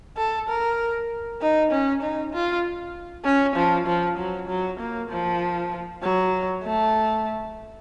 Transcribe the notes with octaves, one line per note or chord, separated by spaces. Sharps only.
A4
A#4
D#4
C#4
D#4
F4
C#4
F3
F3
F#3
F#3
A#3
F3
F#3
A3